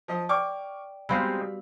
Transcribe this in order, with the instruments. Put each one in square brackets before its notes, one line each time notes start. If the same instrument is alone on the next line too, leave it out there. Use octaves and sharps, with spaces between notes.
[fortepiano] F3 D#5
[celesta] D5 G5 [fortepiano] C#6 D6 F6
[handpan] B2 G3 F5 [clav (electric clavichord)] G#3 C4 D#4 [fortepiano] B5 [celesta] E6